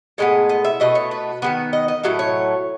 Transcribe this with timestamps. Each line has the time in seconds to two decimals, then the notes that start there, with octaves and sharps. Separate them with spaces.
0.18 A2 G#3 B3 D#5
0.49 D#5
0.65 E5
0.80 B2 A3 D#5
0.95 C#5
1.11 B4
1.42 D#3 G#3 B3 B4
1.73 D#5
1.88 D#5
2.03 A2 F#3 A3 D#5
2.19 C#5